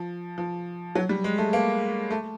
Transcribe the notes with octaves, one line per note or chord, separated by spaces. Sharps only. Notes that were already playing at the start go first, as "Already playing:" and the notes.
Already playing: F3
F3
F#3
G3
G#3
A3
A#3
A3